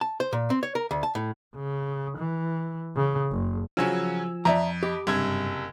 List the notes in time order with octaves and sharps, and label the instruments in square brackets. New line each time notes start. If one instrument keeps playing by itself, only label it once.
[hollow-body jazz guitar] A5
C5
A#2
C4
C#5
A#4
D2
A5
A2
[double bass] C#3
E3
C#3
F#1
[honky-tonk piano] C#3 F#3 C#4 [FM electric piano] F3 G#5 E6
[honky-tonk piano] F2 [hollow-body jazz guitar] D5 E5 A#5
[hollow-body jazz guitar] G4 [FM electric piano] D#5 B5 D6
[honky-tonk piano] F#1 C3 G#6 [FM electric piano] G2